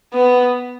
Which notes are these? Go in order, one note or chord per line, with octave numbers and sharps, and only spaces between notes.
B3